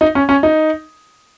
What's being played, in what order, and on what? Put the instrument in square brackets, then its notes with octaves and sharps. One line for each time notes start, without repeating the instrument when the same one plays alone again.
[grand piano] D#4
C#4
C#4
D#4